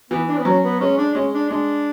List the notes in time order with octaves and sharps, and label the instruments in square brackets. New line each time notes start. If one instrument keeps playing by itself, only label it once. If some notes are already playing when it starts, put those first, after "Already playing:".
[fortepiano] E3 [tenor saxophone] B3
[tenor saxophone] D4
B3
[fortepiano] F#3 [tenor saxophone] C#4
[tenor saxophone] B3
[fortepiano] G#3 [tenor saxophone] C#4
[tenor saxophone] D4
[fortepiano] G#3 [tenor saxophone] C#4
[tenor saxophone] D4
[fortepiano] G#3 [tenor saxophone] D4